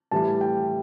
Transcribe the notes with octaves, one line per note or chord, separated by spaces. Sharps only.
A2 E3 G3 A5
G5